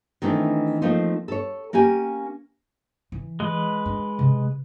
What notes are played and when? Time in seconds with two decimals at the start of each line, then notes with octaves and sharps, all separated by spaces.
0.22 D#3 E3 A3 C4 D4
0.82 F3 A3 A#3 C4 D#4 F4
1.28 A4 C#5
1.73 A#3 C#4 G4 G#5
3.12 E3
3.40 G#3 B4
3.86 D4
4.19 C3